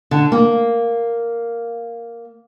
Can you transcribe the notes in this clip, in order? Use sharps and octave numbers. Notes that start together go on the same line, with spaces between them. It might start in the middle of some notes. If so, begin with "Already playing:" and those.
D3
A#3